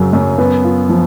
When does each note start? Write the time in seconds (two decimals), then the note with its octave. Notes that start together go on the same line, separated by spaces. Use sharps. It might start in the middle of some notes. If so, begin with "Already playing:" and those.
Already playing: F#2 C#3 F#3
0.13 F#2
0.38 B3
0.64 F4
0.89 F3